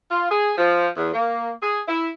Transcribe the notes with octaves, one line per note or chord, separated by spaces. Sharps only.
F4
G#4
F3
E2
A#3
G#4
E4